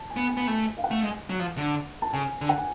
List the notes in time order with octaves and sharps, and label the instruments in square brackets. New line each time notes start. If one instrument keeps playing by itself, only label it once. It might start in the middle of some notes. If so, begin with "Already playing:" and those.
Already playing: [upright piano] A5
G#5
[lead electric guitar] B3
[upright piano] G#5
[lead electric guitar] B3
[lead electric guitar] A3 [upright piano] A5
[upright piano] F5
F#5
[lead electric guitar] A3
G#3
F#3
F3
D3
[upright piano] A5
[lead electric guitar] C#3 [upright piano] G#5
[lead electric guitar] D3
[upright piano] F#5
G#5